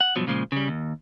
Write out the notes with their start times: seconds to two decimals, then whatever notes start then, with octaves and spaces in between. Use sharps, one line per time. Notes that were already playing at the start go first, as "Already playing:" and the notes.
0.01 F#5
0.16 G2 B2 F3 F#3
0.27 A#2 C#3 F3 G#3
0.52 C#3 G3
0.68 D#2